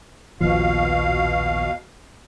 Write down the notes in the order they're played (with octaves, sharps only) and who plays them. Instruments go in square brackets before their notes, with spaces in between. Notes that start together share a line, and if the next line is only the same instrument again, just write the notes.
[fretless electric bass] A#1 D#2 F3 [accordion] B2 F5